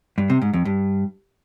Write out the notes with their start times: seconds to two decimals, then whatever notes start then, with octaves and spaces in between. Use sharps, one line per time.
0.18 G2
0.30 C3
0.42 G#2
0.53 F2
0.65 G2